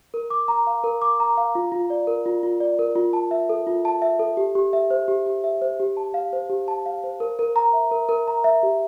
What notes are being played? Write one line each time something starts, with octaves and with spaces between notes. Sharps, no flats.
A#4
D6
A#5
F5
A#4
D6
A#5
F5
F4
F4
D5
A#4
F4
F4
D5
A#4
F4
A5
E5
A4
F4
A5
E5
A4
G4
G4
E5
C5
G4
G4
E5
C5
G4
A5
F5
C5
G4
A5
F5
C5
A#4
A#4
A#5
E5
A#4
A#4
A#5
E5
G4